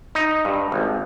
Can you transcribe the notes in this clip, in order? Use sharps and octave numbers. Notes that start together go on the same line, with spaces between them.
D#4
G2
G#1